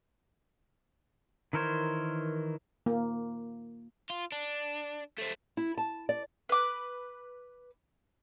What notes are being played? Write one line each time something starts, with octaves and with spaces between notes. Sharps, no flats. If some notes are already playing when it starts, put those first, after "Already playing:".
D#3 E3 A#4 C5 C#5
A#3
F4
D4
A3 C4
E4
A5
D5
B4 D6